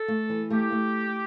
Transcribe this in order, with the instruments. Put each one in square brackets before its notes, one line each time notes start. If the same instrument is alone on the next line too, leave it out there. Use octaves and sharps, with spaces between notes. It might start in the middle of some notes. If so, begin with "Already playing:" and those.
Already playing: [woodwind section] A4
[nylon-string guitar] A3
E3
[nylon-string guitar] A3 [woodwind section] G4
[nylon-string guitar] A3